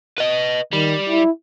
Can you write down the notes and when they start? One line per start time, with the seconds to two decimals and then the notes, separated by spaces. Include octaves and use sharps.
0.18 B4 D#5
0.73 D#3 G3
1.09 E4